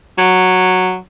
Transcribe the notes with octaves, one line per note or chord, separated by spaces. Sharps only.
F#3